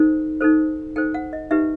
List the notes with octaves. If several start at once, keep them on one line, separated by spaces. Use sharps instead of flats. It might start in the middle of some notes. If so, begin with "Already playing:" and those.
Already playing: D#4 A4 C5
D#4 A4 C5
D#4 A4 C5 G5
F#5
D#5
D#4 G4 B4 E5